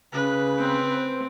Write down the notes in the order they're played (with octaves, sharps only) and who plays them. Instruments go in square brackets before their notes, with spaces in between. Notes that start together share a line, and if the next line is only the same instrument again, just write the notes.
[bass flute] C#3 [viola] B4
[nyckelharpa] C4
[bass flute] C5